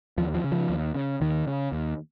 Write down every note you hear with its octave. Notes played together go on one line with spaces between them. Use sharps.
D#2 F3
F3
C#3
F3
D#2
C#3
D#2 D#3
C#3
D#2